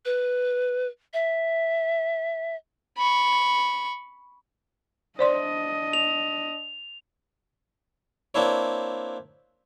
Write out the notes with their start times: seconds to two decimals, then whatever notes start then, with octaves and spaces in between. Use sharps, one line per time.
0.05 B4
1.14 E5
2.98 B5 C#6
5.19 D4 C5 D5 D#5 C6
5.93 F7
8.34 A#3 C4 D4 E4 C#5